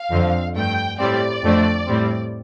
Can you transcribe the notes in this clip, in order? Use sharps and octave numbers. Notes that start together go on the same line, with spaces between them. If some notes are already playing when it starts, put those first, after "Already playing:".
Already playing: F5
F2 D3 F3 C4
G2 F3 A3 G5
A2 G3 C4 D5
F2 D3 A3 C4
A2 G3 C4